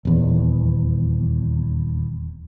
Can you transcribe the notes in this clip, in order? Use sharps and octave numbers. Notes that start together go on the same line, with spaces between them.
D#1 E2